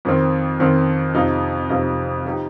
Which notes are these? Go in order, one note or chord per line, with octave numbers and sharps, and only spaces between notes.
F2 D#3 C4
F2 D#3 C4
F2 C3 F3 D#4
F2 C3 F3 D#4
F3 D#4 G4